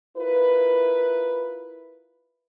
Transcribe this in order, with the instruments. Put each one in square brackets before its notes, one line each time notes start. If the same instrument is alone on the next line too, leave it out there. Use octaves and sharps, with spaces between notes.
[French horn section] E4 F4 A#4 B4